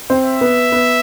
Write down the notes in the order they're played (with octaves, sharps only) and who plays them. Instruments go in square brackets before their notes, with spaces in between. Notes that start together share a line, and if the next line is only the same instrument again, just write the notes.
[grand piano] C4 C5
[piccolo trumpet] E5
[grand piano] B3 B4
B3 B4